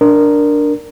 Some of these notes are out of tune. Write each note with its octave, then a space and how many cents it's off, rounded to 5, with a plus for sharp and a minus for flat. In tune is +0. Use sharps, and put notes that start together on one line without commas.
D4 +0 A#4 +0